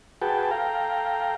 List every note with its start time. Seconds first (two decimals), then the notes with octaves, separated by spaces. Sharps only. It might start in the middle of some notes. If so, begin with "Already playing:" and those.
0.22 F#4 G#4 B4 G5 A5
0.51 A4 F5 G5 A#5